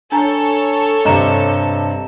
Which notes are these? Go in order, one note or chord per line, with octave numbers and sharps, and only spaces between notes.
D4 A4 C#5 G#5 A#5
G2 C3 D#5 A#5 E7